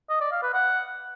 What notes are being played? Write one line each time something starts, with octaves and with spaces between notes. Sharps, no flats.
D#5
D5
F5
B4
F#5